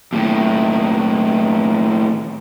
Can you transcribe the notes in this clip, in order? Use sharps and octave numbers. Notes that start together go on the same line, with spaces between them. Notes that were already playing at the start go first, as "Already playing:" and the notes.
D#2 A2